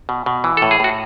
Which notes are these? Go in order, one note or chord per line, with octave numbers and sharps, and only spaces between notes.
B2
B2
E3
A2 A4
G#4
A2 F#4